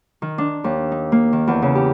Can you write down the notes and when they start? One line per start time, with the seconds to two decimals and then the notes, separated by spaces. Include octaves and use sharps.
0.22 D#3
0.38 D4
0.64 D#2
0.92 D#4
1.12 A#3
1.33 D#3
1.48 E2
1.62 C#3
1.75 G4